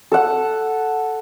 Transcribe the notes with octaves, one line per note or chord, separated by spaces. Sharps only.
A4 F#5